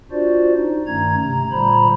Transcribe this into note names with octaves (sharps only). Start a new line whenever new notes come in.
D4 F4 F#4 C5 D5
D#4
G2 D#3 A3 C#4 A#5 G#6
C3 A3 A#5
A#2 D3 G3 C5 A#5 B5